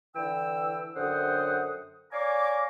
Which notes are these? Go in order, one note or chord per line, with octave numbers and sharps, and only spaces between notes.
D3 E3 G5 E6
F#2 D3 C5 F#5 G5 D#6
C#5 D5 F5 G#5 A#5 D6